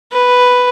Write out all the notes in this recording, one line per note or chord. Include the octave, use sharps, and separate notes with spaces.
B4